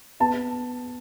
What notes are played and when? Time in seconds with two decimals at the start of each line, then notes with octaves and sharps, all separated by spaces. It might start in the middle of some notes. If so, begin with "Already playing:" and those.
0.20 B3 A5